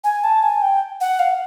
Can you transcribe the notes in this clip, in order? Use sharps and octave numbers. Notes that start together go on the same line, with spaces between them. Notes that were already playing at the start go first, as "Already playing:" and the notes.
G#5
A5
G#5
G5
F#5
F5